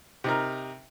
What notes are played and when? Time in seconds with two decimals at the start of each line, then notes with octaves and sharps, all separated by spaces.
0.24 C3 D#4 A#4